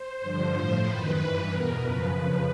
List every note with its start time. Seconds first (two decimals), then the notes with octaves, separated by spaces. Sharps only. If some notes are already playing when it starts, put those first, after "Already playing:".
Already playing: C5
0.20 G2 D3 F3
0.53 A2 F3 C5
0.84 F#2 D#3 B4
1.17 G2 E3
1.49 E2 B2 A#4
1.81 F#2 C#3 F3 B4
2.13 F2 C#3 F3 B4